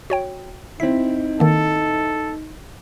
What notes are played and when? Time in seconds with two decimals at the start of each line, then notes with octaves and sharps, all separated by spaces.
0.10 F#4 C#5 G5
0.80 C4 D#4 E4 B6
1.40 D#3 A#3 A4